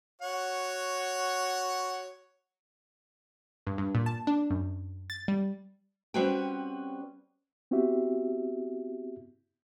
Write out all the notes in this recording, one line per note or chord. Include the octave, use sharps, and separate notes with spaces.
F#4 C#5 F#5
G2
G2
A#2
A5
D4
F#2
A6
G3
G3 C4 C#4 F#4 B4 G5
B3 C4 E4 F#4 G4 E5